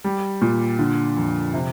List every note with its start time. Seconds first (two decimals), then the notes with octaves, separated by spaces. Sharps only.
0.04 G3
0.42 A#2
0.79 D3
1.17 F2
1.54 C3